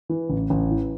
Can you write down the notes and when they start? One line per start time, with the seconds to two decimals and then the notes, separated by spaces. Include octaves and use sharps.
0.09 E3
0.30 A1
0.50 A1
0.71 E3